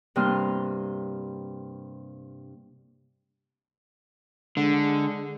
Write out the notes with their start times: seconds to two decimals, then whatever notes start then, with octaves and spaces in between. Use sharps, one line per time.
0.16 G2 C3 G3 A#3 C6 F6
4.57 D3 G#3